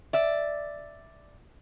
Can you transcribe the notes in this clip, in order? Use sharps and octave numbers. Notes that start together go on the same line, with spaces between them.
D5 E5